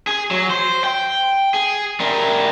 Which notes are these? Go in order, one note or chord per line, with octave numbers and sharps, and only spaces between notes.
G#4
F#3
C5
G5
G#4
G3 A#4